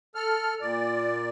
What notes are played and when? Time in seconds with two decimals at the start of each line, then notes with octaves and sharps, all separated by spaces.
0.15 A4 F6
0.61 A#2 D5